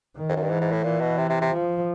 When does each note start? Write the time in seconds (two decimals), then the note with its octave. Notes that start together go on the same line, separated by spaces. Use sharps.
0.16 D#3
0.29 F2
0.36 F#2
0.43 G2
0.49 G#2 E3
0.61 G#2
0.72 A2
0.84 A#2 E3
1.01 B2
1.18 C3
1.30 C3
1.41 C3
1.52 F3